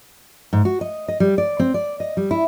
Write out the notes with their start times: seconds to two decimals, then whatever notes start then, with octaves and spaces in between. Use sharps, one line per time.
0.53 G#2
0.65 F#4
0.81 D#5
1.08 D#5
1.20 G3
1.38 D5
1.59 C4
1.74 D5
2.00 D#5
2.17 G3
2.31 E4